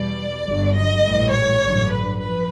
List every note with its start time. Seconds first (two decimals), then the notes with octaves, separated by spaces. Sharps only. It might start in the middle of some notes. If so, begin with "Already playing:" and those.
Already playing: E2 B2 G3 D5
0.44 G1 G2 D3 F#3
0.74 D#5
1.02 A#1 A2 E3 G3
1.32 C#5
1.62 A1 G2 D3 F#3
1.91 B4
2.20 F3 B4